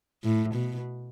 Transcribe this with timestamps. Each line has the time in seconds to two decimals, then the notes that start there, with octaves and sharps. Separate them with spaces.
0.24 A2
0.55 B2